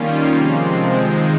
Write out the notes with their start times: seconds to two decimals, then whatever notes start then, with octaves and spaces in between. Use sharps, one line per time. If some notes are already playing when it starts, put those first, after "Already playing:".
Already playing: D#3 G3 A#3 C#4 F4
0.29 C3 F3 G#3 C4
0.94 D#3 G#3 D#4